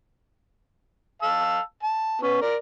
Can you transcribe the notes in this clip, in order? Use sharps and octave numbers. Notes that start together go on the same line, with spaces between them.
F5 A5 E6
A5
B3 C#4
A#4 D5